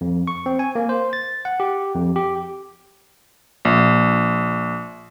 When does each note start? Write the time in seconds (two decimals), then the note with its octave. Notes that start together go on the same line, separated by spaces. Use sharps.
0.01 F2
0.27 C#6
0.46 C4
0.59 G#5
0.75 A#3
0.89 C5
1.13 A6
1.45 F#5
1.60 G4
1.94 F2
2.16 G4
3.65 A#1